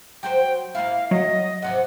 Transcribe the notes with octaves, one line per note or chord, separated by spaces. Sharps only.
F#3 F#4 C5 G5
A#3 E4 F5
F#3 D#5
F2 C3 E3 F#5